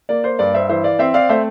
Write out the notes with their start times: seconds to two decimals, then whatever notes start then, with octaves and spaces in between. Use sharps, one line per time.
0.09 A#3 D5
0.24 C5
0.39 G2 D5
0.54 C5 E5
0.69 E3 C5 E5
0.84 D5 F5
0.99 C4 C5 E5
1.14 D5 F5
1.29 A3 C5 E5